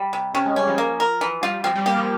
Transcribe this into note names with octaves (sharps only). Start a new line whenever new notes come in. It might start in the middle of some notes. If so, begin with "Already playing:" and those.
Already playing: G3
C3
C3 C#4
G#3
G3 C#4
F3
F3 A#3
A#4
E3
G3 F4
F3 C4
G3
A#3 G4
F3